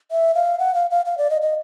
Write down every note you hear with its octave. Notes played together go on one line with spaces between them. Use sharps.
E5
F5
F#5
F5
F5
F5
D5
D#5
D#5